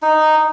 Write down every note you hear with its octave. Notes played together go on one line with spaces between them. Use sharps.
D#4